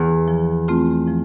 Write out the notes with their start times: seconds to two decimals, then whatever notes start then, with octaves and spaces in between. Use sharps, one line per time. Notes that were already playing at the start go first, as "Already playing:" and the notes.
Already playing: E2
0.28 F3
0.68 A3 C4 F4
1.07 F3